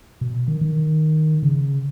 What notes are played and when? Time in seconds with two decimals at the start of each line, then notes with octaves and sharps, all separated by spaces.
0.21 B2
0.48 D#3
0.61 D#3
1.43 C#3